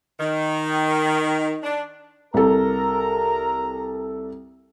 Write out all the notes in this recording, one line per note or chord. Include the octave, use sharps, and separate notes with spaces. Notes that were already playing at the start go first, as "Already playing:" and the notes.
D#3
D4
C2 A4 A#4 A#5